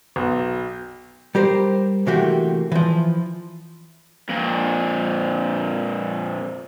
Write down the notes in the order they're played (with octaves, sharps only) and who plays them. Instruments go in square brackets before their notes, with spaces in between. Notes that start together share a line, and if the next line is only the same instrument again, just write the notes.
[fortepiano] B1
[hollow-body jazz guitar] G3 G4 A#4 C5
C3 E3 A3 A#3 F#4 G4
E3 F3
[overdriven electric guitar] F2 A#2